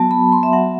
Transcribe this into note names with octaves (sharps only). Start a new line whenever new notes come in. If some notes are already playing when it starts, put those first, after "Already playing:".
Already playing: F#3 B3 F#4 A5
B5
C6
E5
F#3 B3 F#4 F#5